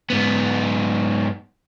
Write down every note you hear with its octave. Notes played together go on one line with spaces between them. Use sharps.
G#2 B3